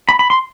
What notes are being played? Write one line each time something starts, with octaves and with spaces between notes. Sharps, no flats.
B5
B5
C6